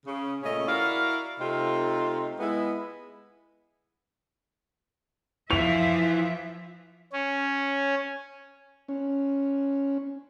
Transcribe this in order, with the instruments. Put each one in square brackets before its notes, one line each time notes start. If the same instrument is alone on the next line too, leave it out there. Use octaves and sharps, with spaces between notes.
[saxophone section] C#3
A#2 C#3 A3 C#4 D#5
E4 F#4 A#4 D5 F5
C3 A3 C4 D#4 F4
G#3 B3 E4
[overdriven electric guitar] E3 [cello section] F3 E5 [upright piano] F7
[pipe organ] C#4
[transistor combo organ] C#4